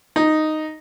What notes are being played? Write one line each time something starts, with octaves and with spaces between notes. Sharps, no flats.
D#4